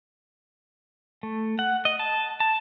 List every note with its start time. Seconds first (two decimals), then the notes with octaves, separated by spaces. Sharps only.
1.23 A3
1.59 F#5
1.85 D#5
1.99 A5
2.40 A5